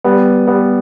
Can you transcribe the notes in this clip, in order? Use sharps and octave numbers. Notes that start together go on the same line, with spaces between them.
G3 B3
G3 B3